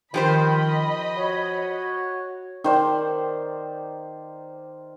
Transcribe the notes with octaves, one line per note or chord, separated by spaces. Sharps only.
D#3 F3 G4 C5 D#5 B5
F#4 C#5
D#3 C5 D5